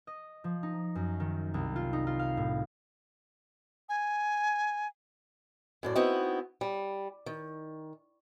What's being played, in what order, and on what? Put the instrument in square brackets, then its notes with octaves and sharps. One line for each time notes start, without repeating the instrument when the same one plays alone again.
[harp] D#5
F3
D#4
F#2
D#3
C2
F4
D#4
F4
F5
A2
[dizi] G#5
[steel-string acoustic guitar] F#2 A2 D5
B3 C4 D#4 E4 F#4
G3
D#3